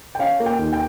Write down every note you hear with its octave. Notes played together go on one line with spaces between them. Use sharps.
G5
C#4 F5
A#3
G5
D#2
G5